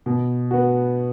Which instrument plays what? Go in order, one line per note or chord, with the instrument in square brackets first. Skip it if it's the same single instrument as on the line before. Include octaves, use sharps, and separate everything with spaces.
[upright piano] B2
B3 F#4